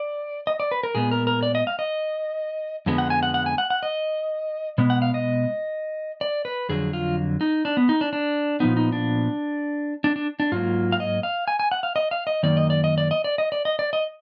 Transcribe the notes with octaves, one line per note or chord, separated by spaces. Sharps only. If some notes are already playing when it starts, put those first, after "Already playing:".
Already playing: D5
D#5
D5
B4
A#4
A#2 G#3 B3 G#4
A#4
A#4
D5
D#5
F5
D#5
F2 D3 G#3 B3
F#5
G#5
F#5
F#5
G#5
F#5
F#5
D#5
B2 G#3 B3
F#5
F5
D#5
D5
B4
F2 D3 F#3 G#4
F4
D#4
D4
B3
D#4
D4
D4
A#2 F3 B3 D#4
D#4
D4
D4
D4
D4
G#2 F#3 A#3 F4
F5
D#5
F5
G#5
G#5
F#5
F5
D#5
F5
D#5
F#2 D#3 A#3 D5
D#5
D5
D#5
D5
D#5
D5
D#5
D5
D#5
D5
D#5